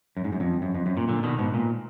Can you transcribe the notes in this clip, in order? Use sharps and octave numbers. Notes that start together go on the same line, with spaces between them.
F#2
G#2
F#2
F2
F#2
F2
F#2
A#2
A#2 D3
B2 D#3
G#2 B2
A#2